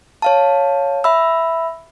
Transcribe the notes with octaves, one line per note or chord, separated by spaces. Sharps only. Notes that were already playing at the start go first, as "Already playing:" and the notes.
C#5 F5 A5
E5 B5 E6